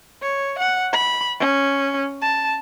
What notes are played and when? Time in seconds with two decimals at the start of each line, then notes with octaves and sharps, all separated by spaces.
0.22 C#5
0.59 F#5
0.93 B5
1.39 C#4
2.22 A5